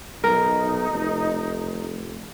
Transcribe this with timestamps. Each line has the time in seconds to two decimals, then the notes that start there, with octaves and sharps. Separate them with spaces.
0.24 B1 D#4 A#4
0.90 F1